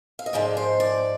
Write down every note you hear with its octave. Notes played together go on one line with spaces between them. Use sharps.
F5
D#5
G#2 F3 G#3 D5
C5
D5